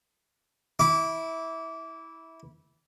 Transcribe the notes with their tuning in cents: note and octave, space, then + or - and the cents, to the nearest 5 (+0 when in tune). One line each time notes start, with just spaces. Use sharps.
E4 -20 D6 -20